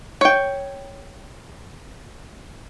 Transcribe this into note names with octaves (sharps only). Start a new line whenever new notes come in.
C#5 G5